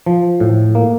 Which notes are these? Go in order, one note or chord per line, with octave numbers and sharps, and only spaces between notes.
F3
A2
A#3